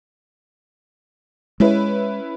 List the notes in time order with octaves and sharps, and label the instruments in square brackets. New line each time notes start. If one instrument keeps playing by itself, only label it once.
[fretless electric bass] G#3 [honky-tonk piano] C#4 E4 B4